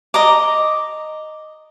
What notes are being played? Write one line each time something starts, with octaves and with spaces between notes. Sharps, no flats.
D#5 A#5 D6